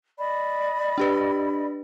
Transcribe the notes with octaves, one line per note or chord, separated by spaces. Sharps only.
D5 D#5 B5
D4 G4 B4